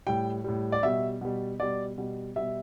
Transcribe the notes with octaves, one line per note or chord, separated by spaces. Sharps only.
A2 G3 G5
A2 G3
D5
B2 G3 E5
B2 G3
B2 G3 D5
B2 G3
B2 G3 E5